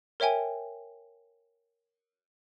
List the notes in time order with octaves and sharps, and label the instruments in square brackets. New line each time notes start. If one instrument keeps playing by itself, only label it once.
[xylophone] A#4 C#5 E5 G5 G#5